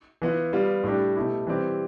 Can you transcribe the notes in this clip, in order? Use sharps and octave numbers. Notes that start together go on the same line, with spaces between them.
E3 B3 F4
G3 B3 F4
A2 G3 D4 G4
B2 A3 E4 G4
E3 G3 C4 G4